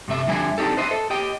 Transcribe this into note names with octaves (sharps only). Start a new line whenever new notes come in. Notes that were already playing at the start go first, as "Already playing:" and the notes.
G2 C3 A3 E5
F2 D3 G3 E5 G#5
C4 D4 D#4 G4 A4
B4 C5 D#5 E5
A4
G4 D#5 G5